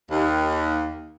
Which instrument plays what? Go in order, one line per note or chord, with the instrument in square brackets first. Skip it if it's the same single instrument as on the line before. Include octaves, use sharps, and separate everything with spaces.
[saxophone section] D#2